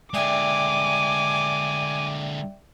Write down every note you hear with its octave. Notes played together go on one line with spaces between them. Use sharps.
D3 G#3 D5 E5 G5 G#5 D6